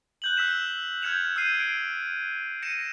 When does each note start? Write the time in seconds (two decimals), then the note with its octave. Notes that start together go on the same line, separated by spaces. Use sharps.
0.22 F#6 G6 F#7
0.37 E6 B6 E7
1.02 F6 G6 G#6 C#7 E7 F7
1.36 E6 F6 G6 C7 D#7
1.59 D7
2.62 A#6 C#7 D#7 E7